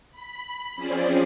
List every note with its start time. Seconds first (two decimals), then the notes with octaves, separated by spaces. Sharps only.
0.11 B5
0.75 F3 C4 C#4 G#4 C5 D5